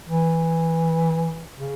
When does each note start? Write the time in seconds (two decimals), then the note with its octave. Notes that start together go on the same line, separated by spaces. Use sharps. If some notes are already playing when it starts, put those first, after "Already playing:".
0.08 E3
1.57 C#3